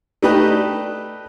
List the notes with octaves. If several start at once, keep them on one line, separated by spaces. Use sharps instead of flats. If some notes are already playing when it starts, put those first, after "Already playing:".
A3 D4 D#4 G4 B4